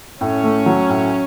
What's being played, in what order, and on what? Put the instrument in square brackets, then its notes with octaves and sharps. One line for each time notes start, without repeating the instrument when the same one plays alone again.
[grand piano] A2 [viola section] C#4
[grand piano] A3
F#3
A2